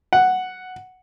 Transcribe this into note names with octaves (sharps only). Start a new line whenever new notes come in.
F#5